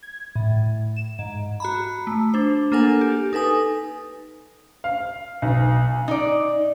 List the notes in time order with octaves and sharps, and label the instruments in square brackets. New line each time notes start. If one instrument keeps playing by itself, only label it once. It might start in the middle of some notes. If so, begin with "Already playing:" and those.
[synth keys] G#6
A2
E7
G#2
[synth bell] F#4 A#5 B5
A3
D4 C5
A#3 D4 A4 A#4 F#5 G#5
G4
D#4 A4 B4 G#5 D#6
[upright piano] F5
B1
[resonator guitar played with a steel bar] D#4 D5